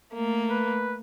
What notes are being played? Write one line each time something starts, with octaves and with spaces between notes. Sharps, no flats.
A3 A#3
B4